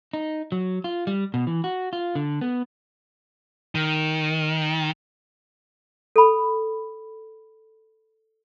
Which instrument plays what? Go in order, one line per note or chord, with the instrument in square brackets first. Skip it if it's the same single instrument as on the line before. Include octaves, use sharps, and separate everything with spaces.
[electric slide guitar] D#4
F#3
F4
G3
B2
E3
F#4
F4
D3
B3
[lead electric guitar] D#3
[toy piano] A4 B5